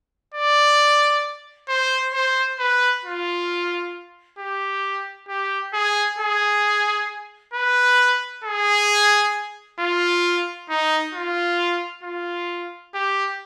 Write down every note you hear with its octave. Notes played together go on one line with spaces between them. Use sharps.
D5
C5
C5
B4
F4
G4
G4
G#4
G#4
B4
G#4
F4
D#4
F4
F4
G4